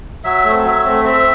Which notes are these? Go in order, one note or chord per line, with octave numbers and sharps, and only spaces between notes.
F#3 E5
A3 C4
F#3
A3 C4
C4 E5